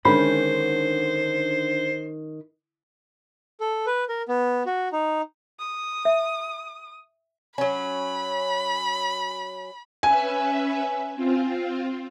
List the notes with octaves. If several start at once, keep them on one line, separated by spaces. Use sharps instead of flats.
D3 D#3 G#3 C#4 C5 B5
A4
B4
A#4
B3
F#4
D#4
D#6
E5
F#3 C#4 B5
C#4 B4 E5 G#5
C4 F4